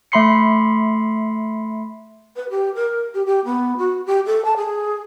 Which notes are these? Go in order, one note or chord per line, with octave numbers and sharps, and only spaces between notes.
A3 E5 B5 C6 C7 C#7
B4
G4
A#4
G4
G4
B3
F#4
G4
A4
A5
G#4